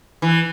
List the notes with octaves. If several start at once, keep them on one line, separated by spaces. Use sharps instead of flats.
E3